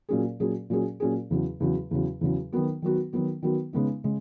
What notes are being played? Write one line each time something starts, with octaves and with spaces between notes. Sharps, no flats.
A#2 F#3 C#4 G#4
A#2 F#3 C#4 G#4
A#2 F#3 C#4 G#4
A#2 F#3 C#4 G#4
E2 C#3 F#3
E2 C#3 F#3
E2 C#3 F#3
E2 C#3 F#3
D#3 F#3 B3 F#4
D#3 F#3 B3 F#4
D#3 F#3 B3 F#4
D#3 F#3 B3 F#4
C#3 G#3 B3 D#4
C#3 G#3